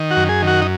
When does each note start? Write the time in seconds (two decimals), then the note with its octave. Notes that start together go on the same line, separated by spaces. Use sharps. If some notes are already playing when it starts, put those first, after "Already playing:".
Already playing: D#3
0.11 F#4
0.17 F#2
0.29 G#4
0.42 D#3
0.47 F#4
0.62 D#4